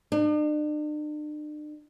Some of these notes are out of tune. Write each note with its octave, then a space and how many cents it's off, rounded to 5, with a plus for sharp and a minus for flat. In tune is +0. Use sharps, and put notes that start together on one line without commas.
D4 +45